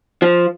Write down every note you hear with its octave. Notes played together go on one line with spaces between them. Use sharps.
F3